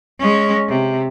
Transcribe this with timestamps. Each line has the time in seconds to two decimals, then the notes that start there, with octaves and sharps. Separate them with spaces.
0.19 G#3 C#4
0.68 C3